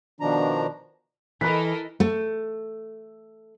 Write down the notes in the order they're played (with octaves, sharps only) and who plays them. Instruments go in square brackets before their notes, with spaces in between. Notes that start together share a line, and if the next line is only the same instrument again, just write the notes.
[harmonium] B2 D#3 F3 D4 A#5
[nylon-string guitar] E3 [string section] A4 A#4 D#5 [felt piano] B5 F#6 B6
[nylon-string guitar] A3